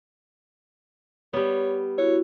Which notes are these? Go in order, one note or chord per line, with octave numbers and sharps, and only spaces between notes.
G3 B3 C#5
E4 F#4 C#5